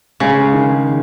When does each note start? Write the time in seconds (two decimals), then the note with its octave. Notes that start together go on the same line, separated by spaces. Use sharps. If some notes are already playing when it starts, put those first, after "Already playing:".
0.20 C#3 G#3
0.54 D#3